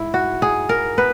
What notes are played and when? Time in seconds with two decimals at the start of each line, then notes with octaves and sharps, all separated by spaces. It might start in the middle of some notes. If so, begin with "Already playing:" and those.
Already playing: G#2 E4
0.14 F#4
0.42 G#4
0.69 A#4
0.97 B3 B4